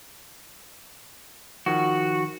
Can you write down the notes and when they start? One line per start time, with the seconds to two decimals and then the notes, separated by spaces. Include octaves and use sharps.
1.66 D#3 F3 F#4